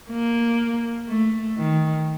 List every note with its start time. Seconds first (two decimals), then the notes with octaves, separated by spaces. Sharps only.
0.10 A#3
1.08 A3
1.57 D#3